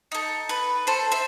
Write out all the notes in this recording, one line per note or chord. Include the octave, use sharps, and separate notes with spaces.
D#4 A4
B4
A4 C5
C5 E5